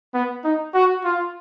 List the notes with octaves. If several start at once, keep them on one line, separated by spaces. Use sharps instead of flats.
B3
D#4
F#4
F4